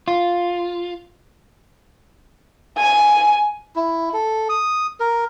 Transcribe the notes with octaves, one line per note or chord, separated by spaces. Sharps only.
F4
G#5
E4
A4
D#6
A#4